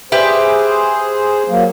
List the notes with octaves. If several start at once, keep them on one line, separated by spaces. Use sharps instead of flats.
G4 G#4 B4 C5 E5
F#3 A#3